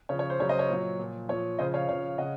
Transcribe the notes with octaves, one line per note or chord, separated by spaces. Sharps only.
C#3 F3 C#5
C#5
C5
C#3 F#3 C#5
C5 D#5
C#5
A#2 F#3
A#2 F3
A#2 F3 C#5
C#3 F3 C5 D#5
C#5 F5
C#3 F3 C#5 F5
C#3 D#5 F#5